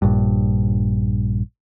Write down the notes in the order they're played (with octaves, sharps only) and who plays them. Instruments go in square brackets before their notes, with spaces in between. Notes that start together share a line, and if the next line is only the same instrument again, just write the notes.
[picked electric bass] A#1 G2